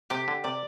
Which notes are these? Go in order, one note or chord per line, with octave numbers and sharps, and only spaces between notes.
C3 G4
D3
C3 D5